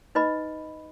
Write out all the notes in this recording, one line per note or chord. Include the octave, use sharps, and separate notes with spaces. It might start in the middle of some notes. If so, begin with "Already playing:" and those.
D#4 B4 D#5 B5